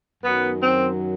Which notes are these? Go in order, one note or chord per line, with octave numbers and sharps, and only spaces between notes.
F#2 D#3 F#3 B3
C4